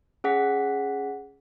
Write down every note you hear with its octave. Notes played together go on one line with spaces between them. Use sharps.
C#4 G#4 F#5 B6